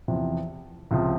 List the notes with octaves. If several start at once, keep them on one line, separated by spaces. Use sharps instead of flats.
E2 C3 F3
C#2 C3 F3